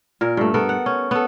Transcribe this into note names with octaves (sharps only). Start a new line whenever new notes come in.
A#2 A#4
G2 A3
B3 A4 A#4
F#5
C#4
B3 A4